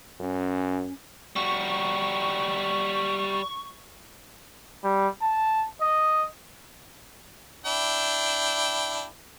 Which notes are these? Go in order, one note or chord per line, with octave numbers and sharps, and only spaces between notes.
F#2 C#4
G3 F#4 C#6
G3
A5
D#5
D4 E4 G5